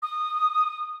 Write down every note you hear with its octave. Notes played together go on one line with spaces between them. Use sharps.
D#6